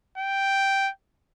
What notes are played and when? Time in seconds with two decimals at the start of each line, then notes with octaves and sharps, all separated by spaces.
0.18 G5